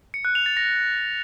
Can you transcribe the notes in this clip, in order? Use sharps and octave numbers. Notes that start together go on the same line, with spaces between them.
C#7
F#6
F7
A6
A#6